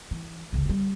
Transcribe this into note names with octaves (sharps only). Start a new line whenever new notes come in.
E3
G1 C#2
F#3 G3